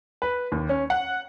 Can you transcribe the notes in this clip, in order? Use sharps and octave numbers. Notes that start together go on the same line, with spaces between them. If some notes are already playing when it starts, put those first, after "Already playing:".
B4
D#2
C#4
F#5